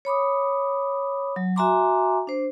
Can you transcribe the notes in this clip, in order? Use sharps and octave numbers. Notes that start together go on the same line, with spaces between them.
C#5 B5 D6 D#6
F#3
F#4 E5 G#5 A#5 C6 D6
D4 C5